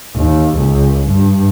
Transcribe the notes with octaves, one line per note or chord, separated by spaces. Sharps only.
D#2
C#2
G2